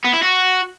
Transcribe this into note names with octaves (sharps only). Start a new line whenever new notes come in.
B3
E4
F#4